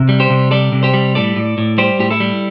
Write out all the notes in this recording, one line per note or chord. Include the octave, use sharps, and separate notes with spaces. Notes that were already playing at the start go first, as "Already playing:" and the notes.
Already playing: C3
G3
G4 C5
C3
G3 A4 D5
C3
G4 C5
G3
A2 A4 D5
A2
A2
G3 G4 C5
A2 G4
E4 A4
G3